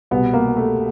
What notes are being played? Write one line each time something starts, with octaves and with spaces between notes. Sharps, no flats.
C2 B2 B3
A#3
A3